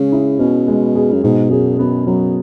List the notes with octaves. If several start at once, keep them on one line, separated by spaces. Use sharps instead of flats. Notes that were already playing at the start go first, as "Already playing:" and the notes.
Already playing: C#3 G#3 G#4
E4
B2 C#4
G#3
G#4
F#2
G#2 B2
F#2 G#4
F#2 B3
F#2 F#3